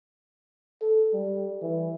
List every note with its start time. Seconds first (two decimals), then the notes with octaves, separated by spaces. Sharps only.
0.82 A4
1.13 G3
1.62 E3